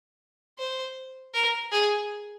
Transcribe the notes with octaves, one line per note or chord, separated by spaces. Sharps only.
C5
A#4
G#4